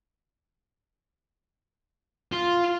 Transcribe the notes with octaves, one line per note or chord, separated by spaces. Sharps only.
F4